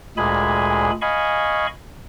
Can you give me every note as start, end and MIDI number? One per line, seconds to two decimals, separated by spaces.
0.17 0.91 38
0.17 0.91 46
0.17 0.91 56
0.17 0.91 68
0.17 0.91 80
0.17 0.91 83
1.02 1.67 75
1.02 1.67 77
1.02 1.67 80
1.02 1.67 83
1.02 1.67 85